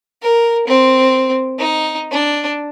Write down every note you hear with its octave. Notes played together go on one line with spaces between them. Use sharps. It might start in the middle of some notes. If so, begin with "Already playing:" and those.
A#4
C4
D#4
D4